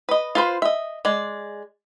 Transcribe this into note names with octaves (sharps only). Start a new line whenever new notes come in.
B4 D#5
F4 B4 C5
D#5 E5
G#3 D5